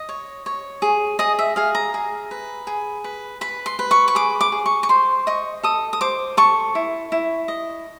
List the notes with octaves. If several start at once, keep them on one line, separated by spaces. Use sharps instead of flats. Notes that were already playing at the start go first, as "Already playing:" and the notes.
Already playing: D#5
C#5
C#5
G#4
G#4 D#5
E5
G#4 F5
A#5
G#4
B4
G#4
B4
B4 B5
C6
B4
C#6
C#6
G#4 D6
D6
G#4
C#6
C#6
C5 C6
D#5 C#6
A4 D#6
D#6
C5 D6
A4 C#6
E4
E4
D#5